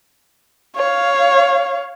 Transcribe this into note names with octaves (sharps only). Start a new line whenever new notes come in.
C#5 F5